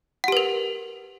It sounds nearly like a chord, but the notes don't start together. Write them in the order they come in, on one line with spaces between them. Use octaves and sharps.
F#5 G4 B4 A#4